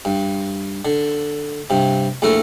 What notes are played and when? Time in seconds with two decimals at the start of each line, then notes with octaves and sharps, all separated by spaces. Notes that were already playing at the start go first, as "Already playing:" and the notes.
0.05 G2
0.85 D3
1.70 G2 C3
2.22 A#1 E2 A3 A4 A#4